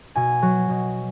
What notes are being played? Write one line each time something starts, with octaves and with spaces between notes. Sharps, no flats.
B2 G#5
F#3
B2